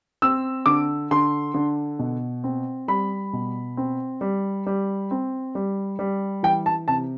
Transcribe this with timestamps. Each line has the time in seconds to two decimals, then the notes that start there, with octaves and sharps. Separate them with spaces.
0.22 C4 E6
0.66 D3 D6
1.11 D3 C6
1.54 D3
1.99 B2
2.44 C4
2.88 G3 B5
3.33 B2
3.77 C4
4.21 G3
4.66 G3
5.11 C4
5.55 G3
5.99 G3
6.43 E3 G5
6.66 A5
6.88 C3 A5